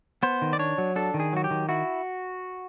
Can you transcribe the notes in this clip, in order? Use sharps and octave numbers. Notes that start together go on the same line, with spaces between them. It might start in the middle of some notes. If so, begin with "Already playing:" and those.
B3 C5
D#3
D5
D4 C#5
F#3
D4 A4
D#3
G#4
F#3 F#4
G4
D#3
E4 F#4